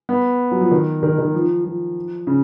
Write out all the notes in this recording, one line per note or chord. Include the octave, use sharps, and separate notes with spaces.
B3
F#3
F3
D#3
D#3
D#3
F3
F3
C#3